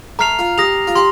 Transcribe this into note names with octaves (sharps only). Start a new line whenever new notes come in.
A3 A#5 F6 C7 F7
F4
G4 D#6 A#6 F7
F4
G4 C6